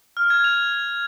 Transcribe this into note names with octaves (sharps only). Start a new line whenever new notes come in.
F6
G#6
F7